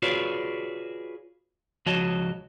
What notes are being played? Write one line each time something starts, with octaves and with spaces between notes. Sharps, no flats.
F4 F#4 G#4 B4 C#5 D5
C#2 F3 F#4 C#5 D#5 A5